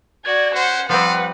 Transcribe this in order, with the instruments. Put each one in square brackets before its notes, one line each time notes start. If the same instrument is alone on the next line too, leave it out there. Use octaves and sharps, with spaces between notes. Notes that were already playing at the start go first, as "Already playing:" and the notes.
[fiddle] F#4 D5 [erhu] G#6
[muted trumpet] C#4 [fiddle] C5 [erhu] F#5
[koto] F3 G3 C4 [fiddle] B4 [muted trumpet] F5 [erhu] F#5